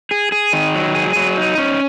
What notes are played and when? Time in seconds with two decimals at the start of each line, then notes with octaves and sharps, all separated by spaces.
0.11 G#4
0.32 G#4
0.53 D#3
0.74 F#3
0.95 G#4
1.16 F#3
1.37 D#4
1.58 C#4